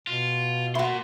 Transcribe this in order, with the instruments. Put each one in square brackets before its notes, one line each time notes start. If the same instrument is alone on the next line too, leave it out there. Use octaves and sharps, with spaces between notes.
[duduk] B2 [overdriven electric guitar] F4
[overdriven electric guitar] A#3 C6 [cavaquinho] E4 F#4